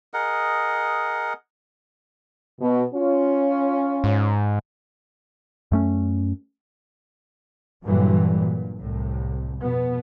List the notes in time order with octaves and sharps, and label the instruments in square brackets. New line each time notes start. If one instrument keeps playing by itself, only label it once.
[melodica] G#4 A#4 D#5 F#5
[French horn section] B2
C#4 F4
[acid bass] G#2
[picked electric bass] F#2 A3 C#4
[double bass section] G2 A#2 D3 E3 F#3 G3
A#2
C2 A2
F2 B2 B3